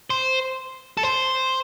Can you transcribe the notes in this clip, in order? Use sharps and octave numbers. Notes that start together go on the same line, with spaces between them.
C5
A4
C5